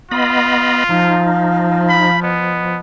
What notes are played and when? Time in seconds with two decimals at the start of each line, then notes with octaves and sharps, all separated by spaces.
0.11 B3 F4 D#5 B5
0.90 F3 D#4 F5
1.89 B5
2.22 B3 D#5